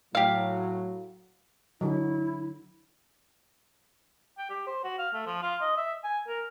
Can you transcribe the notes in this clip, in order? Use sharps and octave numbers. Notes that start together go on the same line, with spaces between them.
A2 F#3 G4 F5
D3 F#3 E4
G5
G4
C5
F#4
F5
A3
F3
F4
D#5
E5
G#5
A#4